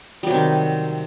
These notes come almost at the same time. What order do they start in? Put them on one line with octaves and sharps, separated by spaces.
G3 F#3 C3 D#3